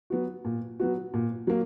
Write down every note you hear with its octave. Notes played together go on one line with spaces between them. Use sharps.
F#3 B3 F#4
A#2
F#3 B3 F#4
A#2
F#3 A#3